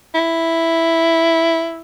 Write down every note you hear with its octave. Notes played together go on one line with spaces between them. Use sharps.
E4